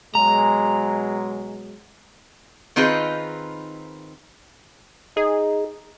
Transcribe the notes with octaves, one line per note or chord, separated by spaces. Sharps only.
B2 F#3 G#3 A#5
D#3 C4 D#4 F4 G#4 B4
D#4 G#4